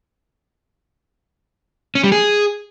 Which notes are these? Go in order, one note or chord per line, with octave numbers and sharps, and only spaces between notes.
C#4
G3
G#4